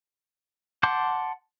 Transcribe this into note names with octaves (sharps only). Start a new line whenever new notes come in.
F#5 A5 C6 D6 G6